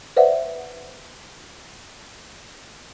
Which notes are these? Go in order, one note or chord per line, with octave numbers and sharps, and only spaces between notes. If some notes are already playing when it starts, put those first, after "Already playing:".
B4 C5 D5 E5 F#5